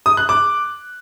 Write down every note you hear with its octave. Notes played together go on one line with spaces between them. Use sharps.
D#6
F#6
D6